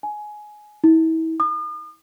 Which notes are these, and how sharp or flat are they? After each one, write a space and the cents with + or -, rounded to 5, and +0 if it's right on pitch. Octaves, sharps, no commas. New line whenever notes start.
G#5 +15
E4 -35
D#6 -45